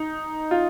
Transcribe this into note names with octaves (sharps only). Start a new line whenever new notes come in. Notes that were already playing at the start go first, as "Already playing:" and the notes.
Already playing: D#4
F4